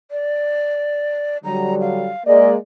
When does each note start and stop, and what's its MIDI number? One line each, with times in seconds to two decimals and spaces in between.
0.11 1.37 74
1.44 2.10 50
1.44 2.10 54
1.44 2.10 55
1.44 1.75 82
1.81 2.23 77
2.26 2.55 56
2.26 2.55 58
2.26 2.55 74
2.26 2.50 75